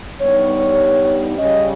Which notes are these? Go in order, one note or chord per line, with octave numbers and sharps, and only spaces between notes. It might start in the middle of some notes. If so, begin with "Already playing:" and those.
G2 G3 B3 D#4 C#5
C#3 G3 C#4 D#5